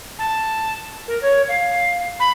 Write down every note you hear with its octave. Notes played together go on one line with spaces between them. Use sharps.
A5
A#4
C#5
F5
B5